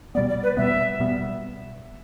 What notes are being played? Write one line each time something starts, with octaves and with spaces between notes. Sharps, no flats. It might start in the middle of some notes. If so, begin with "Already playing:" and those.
B2 G3 B3 D5
D5
B4
B2 G3 B3 E5
B2 G3 B3